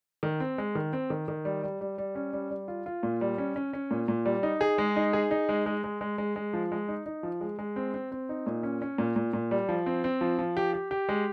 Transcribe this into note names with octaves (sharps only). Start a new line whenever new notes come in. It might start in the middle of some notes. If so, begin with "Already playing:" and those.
D#3
C4
G#3
D#3
C4
D#3
D#3
G3
G3
G3
G3
C#4
G3
G3
F4
F4
A#2
G3
C#4
C#4
C#4
A#2
A#2
G3
D#4
G#4
G#3
D#4
G#4
D#4
G#3
G#3
G#3
G#3
G#3
G#3
F3
G#3
D#4
D#4
F3
G#3
G#3
C4
C4
C4
D#4
A#2
C#4
C#4
A#2
A#2
A#2
G3
F3
C4
C4
F3
F3
G4
G4
G4
G#3